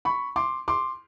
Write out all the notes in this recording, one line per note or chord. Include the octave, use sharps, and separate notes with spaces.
B5 C#6
C6 D6
C6 D6